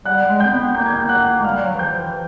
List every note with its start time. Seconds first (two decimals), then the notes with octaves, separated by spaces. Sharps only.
0.06 G3 F#5 F#6
0.22 G3
0.29 G#3
0.40 C4 G5 G6
0.52 B3
0.75 A#3 G6
0.86 G#6
0.96 G5 G6
1.09 F#5 F#6
1.39 G#3
1.44 G3 F5 F6
1.62 F#3
1.74 E3
1.79 F3 G5 G6
1.96 E3